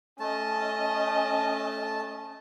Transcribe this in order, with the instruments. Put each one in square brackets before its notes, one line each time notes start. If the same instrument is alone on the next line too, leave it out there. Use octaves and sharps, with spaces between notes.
[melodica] A3 A5 [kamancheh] C#4 D#5